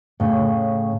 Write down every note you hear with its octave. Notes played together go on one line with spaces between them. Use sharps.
A2 C#3